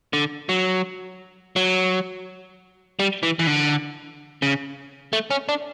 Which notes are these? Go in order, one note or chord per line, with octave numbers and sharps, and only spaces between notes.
D3
F#3
F#3
G3
E3
E3
D3
C#3
A3
C#4
D4